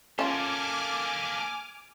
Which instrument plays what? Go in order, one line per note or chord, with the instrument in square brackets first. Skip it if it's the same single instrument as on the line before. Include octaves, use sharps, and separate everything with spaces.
[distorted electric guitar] A#3 A4 [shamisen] C#4 F4 [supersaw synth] G#5 D6 F6